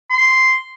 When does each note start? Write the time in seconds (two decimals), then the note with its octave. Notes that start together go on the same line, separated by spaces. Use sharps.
0.10 C6